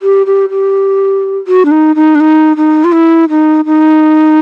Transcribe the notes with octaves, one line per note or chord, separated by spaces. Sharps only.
G4
G4
G4
F#4
D4
D#4
D#4
D4
D#4
D#4
F4
E4
D#4
D#4